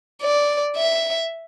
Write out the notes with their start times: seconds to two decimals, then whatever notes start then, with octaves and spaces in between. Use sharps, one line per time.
0.22 D5
0.77 E5